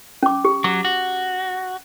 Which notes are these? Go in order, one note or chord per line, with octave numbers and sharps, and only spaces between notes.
C#4 D6
G4
F#3 D6
F#4